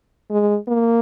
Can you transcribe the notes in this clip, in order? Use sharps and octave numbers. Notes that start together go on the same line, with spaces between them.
G#3
A#3